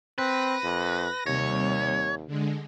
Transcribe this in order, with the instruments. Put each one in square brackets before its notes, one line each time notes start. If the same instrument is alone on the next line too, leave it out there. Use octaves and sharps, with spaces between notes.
[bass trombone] C4 [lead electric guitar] B4 [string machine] A#6
[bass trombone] F2
[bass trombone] D#2 [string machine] C3 G3 [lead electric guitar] C#5
[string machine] D3 G#3